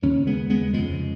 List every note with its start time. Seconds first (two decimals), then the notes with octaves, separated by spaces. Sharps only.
0.02 D#2 C#3 A#3 C#4
0.26 G#3 B3
0.50 G#3 B3
0.73 F2 C#3 F3 G#3